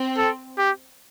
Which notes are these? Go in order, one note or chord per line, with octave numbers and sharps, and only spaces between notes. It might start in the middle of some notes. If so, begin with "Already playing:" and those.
Already playing: C4
A4
G4